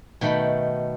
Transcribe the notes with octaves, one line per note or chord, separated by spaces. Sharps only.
B2 D#3 A3 G5 B5